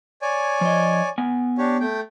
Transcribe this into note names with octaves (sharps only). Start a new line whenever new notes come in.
C#5 D5 G#5
F3 D#5
B3 G#5
D4 G4 C#5
A3 G5